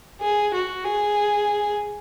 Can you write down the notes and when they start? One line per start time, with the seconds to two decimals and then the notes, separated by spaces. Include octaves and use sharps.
0.21 G#4
0.54 F#4
0.85 G#4